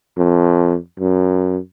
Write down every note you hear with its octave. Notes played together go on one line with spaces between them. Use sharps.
F2
F#2